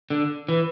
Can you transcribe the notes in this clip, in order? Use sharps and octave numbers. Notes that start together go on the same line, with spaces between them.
D3
E3